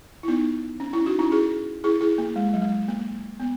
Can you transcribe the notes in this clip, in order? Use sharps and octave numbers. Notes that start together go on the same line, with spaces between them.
E4
B3 D#4
C#4
C#4 E4
D#4 F#4
C#4 E4
E4 G#4
E4 G#4
E4 G#4
A#3
G#3
F#3
G#3
A#3
B3